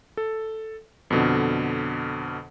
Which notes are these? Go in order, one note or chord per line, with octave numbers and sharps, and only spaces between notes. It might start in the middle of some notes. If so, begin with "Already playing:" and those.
A4
F2 B2 D3